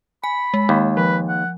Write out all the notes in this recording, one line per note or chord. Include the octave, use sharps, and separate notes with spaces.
G#5 B5
G#3
D#2
F3 B4
F#5